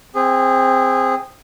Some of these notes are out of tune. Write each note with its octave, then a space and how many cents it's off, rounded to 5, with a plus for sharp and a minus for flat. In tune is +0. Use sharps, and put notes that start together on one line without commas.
C4 +0 G#4 -20